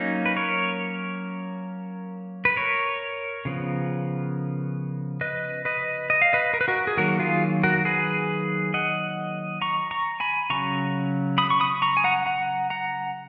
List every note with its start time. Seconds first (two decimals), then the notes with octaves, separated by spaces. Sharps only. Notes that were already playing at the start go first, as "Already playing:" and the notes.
Already playing: F#3 A#3 C#4 D#4
0.26 B4
0.37 A#4 C#5
2.45 B4
2.56 A#4 C#5
3.45 C#3 F3 B3
5.21 B4 D#5
5.65 B4 D#5
6.10 D#5
6.22 F5
6.33 B4 D#5
6.53 A#4
6.61 B4
6.68 F#4 A#4
6.87 G#4
6.97 D#3 F#3 A#3 F#4 A#4
7.19 F4 G#4
7.63 F#4 A#4
7.85 G#4 B4
8.74 D#5 F#5
9.62 A#5 C#6
9.91 A#5 C#6
10.20 G#5 B5
10.50 C#3 F#3 C#4 A#5 C#6
11.38 B5 D#6
11.50 C#6
11.60 B5 D#6
11.82 A#5 C#6
11.97 G#5
12.04 F#5 A#5
12.26 F#5 A#5
12.70 F#5 A#5